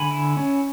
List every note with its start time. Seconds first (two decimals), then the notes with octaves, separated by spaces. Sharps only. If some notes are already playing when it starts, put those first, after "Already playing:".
Already playing: D3 G#5 B5
0.11 E4
0.37 C#4